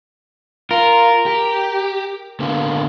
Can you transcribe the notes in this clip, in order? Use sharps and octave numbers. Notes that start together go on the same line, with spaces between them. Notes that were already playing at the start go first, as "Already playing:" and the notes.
F4 A#4
G4
D3 A#3 B3